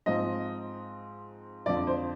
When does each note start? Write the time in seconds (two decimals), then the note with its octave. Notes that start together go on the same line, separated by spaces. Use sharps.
0.06 G#2 F3 C4 D#5
1.66 F2 D3 F3 D5
1.87 C5